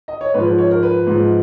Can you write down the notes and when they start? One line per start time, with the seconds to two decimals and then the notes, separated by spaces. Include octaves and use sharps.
0.08 D#5
0.21 C#5
0.34 G#2 F3 B4
0.58 C#5
0.71 A#4
0.83 B4
1.07 G#2 F3